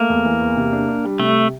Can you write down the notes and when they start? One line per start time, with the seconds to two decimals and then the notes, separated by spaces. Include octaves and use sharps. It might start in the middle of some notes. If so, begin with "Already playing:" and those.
Already playing: A3 A#3
0.10 E2
0.25 E3
0.41 E2
0.57 C3
0.73 D4
0.88 D4
1.04 G3
1.20 C3 A3